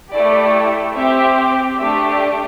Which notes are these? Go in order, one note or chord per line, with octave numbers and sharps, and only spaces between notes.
A3 E4 G4 D5
C4 G4 E5
A3 D4 G4 E5